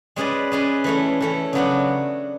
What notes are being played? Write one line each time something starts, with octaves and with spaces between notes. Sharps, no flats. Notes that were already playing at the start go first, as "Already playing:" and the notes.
G#3 C#4 G#4 B4 D5
G#3 C#4 G#4 B4 D5
E3 A3 C#4
E3 A3 C#4
C#3 F#3 B3 D4 F#4